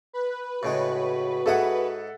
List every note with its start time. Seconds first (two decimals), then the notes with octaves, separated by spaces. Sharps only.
0.13 B4
0.63 A2 C#3 G#3 F#4
1.46 G#2 G#4 A4 E5 F#5 D#6